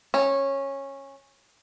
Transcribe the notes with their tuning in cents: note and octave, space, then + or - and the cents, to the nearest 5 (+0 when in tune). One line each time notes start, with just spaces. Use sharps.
C#4 -15